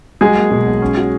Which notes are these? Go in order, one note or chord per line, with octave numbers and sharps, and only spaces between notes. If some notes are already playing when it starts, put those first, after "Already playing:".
F#3 G#3 G#4
A#3
B2
B1
C#4
F#4